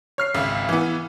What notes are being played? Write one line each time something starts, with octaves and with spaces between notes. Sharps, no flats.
C#5 F6 C7
G#1 C#2 E5
E3 B3